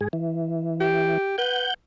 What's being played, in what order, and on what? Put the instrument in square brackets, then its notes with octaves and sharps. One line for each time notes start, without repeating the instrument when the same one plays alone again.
[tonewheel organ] G#2 G#4
E3
[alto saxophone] G4
[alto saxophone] B4 [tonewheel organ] F#5 G6